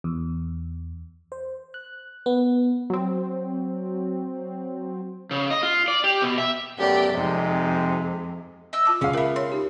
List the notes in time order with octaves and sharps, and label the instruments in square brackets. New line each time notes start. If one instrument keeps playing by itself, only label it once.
[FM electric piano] E2
C5
F#6
B3
[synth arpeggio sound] F#3 C4
[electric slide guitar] C#3
D#5
F4
D5
G4
B2
E5
[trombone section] F#2 A3 B3 [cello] G4 D5
[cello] F2 [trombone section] C3 G#3 D#4
[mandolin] D#5 E5 E6
[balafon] F4 A5 D6
[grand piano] C#2 F5 [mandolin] C#4 C6
[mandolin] B3 C4 [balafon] F4 A#4 E5
[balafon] C#5 [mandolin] C6
[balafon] D#4 G4